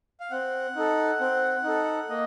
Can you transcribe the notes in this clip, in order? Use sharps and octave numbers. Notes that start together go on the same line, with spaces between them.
F5
C4 F#5
D#4 A4
C4
D#4 A4
A#3 D#5